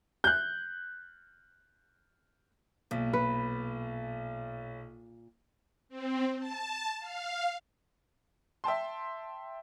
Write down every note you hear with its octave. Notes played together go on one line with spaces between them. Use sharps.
F#6 G6
B1 A#2
B4
C4
A5
F5
E5 G5 A5 C6